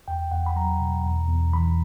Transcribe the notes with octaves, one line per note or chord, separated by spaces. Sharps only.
E2 G5
E2 F#5
B5
F#3 A#5
B2
E2
E2
E3 B5